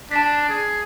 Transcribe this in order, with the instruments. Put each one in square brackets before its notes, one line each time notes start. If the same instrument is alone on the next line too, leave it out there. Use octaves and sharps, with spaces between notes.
[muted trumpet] D4 [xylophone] A5 B6
[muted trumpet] G#4